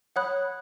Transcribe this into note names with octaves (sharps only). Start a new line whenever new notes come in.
C#5 F#5 B5 D#6 F#6